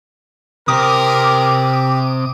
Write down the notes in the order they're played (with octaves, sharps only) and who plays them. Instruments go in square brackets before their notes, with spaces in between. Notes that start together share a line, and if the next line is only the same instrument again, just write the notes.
[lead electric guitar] C3 C5 [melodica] G4 [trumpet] A#4 [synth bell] D6 D#6